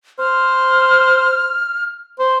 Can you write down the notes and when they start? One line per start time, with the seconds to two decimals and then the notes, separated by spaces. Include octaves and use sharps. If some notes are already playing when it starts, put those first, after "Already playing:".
0.19 C5 F6
2.19 C5